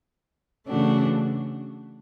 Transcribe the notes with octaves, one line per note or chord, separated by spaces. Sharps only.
C#3 E3 A3 D4 F#4